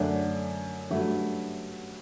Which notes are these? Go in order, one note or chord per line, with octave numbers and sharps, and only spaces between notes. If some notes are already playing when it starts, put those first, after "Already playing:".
Already playing: F#2 D3 A3 D4
G2 F#3 A3